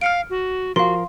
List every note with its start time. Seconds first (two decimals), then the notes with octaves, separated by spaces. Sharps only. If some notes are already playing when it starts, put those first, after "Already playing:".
0.01 F5 F6 C#7 D7
0.30 F#4
0.76 F3 F#4 A#4 F5 C6